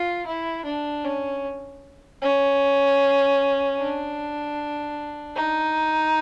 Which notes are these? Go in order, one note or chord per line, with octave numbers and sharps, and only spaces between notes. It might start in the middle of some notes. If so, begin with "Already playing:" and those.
Already playing: F4
E4
D4
C#4
C#4
D4
D#4